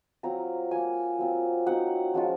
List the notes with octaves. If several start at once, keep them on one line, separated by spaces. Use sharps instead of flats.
F#3 C4 F4 A#5
A#3 F4 G#5
F#3 C4 F4
F#3 C4 D#4 F#5
F3 G#3 C#4 F4